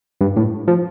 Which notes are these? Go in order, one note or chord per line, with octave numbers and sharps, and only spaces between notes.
G2
A2
F3